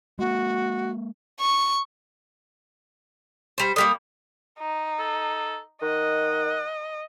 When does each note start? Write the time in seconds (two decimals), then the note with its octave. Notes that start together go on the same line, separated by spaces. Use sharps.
0.19 G#3 A#3 F#4
1.40 C#6
3.58 G3 C5
3.76 D3 G3 A#3 D#6
4.59 D#4
4.99 A4
5.82 D#3 D#5 F#5